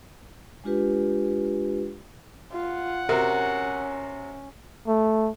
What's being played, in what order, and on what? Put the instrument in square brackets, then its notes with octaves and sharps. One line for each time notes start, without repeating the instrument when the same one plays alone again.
[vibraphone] G#3 D4 F4 G4 B4
[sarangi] F4 [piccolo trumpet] F#5
[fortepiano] C3 F#4 [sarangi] C#4 [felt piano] A#4
[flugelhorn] A3